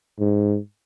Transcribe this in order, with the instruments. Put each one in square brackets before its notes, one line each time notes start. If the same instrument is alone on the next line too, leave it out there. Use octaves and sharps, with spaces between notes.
[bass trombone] G#2